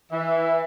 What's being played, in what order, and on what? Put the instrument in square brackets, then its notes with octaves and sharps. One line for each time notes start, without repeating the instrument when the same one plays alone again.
[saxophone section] E3 [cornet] E5